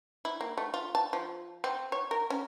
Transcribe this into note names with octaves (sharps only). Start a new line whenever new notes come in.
E4
A#3
A3
F4
A5
F3
C4
C#5
A#4
C#4